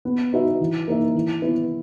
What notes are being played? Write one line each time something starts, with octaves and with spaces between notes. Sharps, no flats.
B3
D#4 F#4 B4 E5
E3
A#3 D#4 A#4 E5
E3
B3 E4 B4